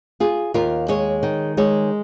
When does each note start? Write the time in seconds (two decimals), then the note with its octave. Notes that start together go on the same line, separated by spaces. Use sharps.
0.20 F4 G#4
0.54 D#2 F4 A#4
0.88 G#3 G#4 C#5
1.23 D#3
1.57 G#3 G#4 C#5